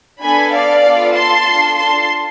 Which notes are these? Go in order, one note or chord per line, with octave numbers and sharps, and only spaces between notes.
B3 D4 A4 G#5 B5
D5 F5
B3 F4 A4
A5 C6
D4 F4 A4
A5 C6